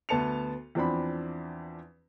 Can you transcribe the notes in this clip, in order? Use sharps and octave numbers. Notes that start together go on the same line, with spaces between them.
D2 B3 A5 C#7 F7
E2 F3 C4 D4 B5